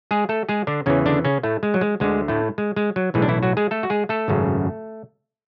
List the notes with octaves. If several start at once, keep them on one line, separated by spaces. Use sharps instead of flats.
G#3 G#4
A3 A4
G#3 G#4
D3 D4
E2 C#3 E3 C#4
D3 D4
C#3 C#4
A2 A3
G#3
F#3
G#3
D2 D3 G#3
A2 A3
G#3
G#3
F#3
B1 A2 E3 G#3
D4
E3 E4
F#3 F#4
G#3 G#4
A3 A4
F#4
G#3 G#4
A3 A4
G#1 F#2 C#3